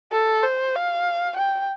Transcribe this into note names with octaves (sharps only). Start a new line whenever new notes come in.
A4
C5
F5
G5